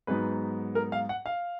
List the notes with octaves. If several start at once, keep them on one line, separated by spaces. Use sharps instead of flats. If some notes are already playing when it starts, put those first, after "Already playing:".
G#2 F#3 B3 D#4 B4
A#4
F5
F#5
F5